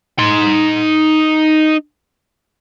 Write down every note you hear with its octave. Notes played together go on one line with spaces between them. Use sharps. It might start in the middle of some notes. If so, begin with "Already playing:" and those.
D#4 C6